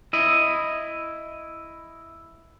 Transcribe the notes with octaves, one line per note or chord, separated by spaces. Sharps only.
E4 D#5